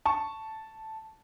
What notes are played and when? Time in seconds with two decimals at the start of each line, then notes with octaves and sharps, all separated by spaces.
0.05 A5 C#6